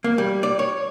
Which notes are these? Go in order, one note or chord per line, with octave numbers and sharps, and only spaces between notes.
A#3
G3
D5
C#5